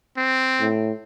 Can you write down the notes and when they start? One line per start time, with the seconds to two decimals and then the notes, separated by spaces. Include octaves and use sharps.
0.17 C4
0.60 A2